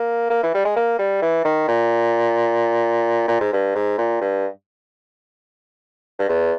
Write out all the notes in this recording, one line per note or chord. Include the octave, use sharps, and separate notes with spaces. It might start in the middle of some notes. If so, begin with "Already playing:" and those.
Already playing: A#3
A#3
E3
G3
G#3
A#3
G3
E3
D#3
A#2
A#2
G#2
G2
G#2
A#2
G2
G2
E2